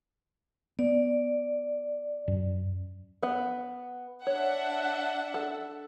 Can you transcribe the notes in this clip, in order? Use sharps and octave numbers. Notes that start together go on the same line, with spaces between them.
B3 D5
F#2
B3 F#5
D4 C#5 E5 F#5
A4